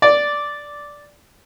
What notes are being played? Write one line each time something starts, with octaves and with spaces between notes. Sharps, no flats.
D5